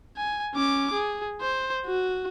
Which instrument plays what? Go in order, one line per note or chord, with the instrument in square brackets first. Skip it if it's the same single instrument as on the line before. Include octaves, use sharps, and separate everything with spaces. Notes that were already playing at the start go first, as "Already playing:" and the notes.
[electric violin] G#5
C#4 D6
G#4
C5
F#4